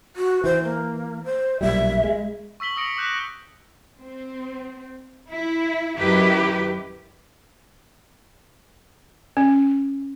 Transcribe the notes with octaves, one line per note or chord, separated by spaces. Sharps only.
F#4
E3 C5
A#3
C5
B1 A#2 G3 E5
G#3
C#6 E6 B6 F#7 G7
D#6 E6 A#6 C#7 D7
D6 E6 F#6 G6 B6
C4
E4
F#2 D#3 E4 G4 B4
C#4